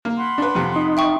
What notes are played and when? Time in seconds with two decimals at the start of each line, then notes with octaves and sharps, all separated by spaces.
0.05 A#3
0.18 F#5 B5 C6
0.38 D4 B4
0.55 F2 C3
0.76 D#4
0.97 E5 G5 C#6